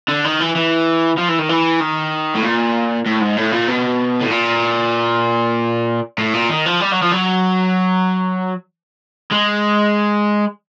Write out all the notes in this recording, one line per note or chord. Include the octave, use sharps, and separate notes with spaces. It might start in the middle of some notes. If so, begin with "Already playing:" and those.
D3
D#3
E3
E3
F3
E3
D#3
E3
D#3
A2
A#2
A2
G#2
A2
A#2
B2
A2
A#2
A2
A#2
D#3
F3
G3
F#3
F3
F#3
G#3